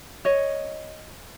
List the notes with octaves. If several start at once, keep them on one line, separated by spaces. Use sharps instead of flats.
C#5 D#5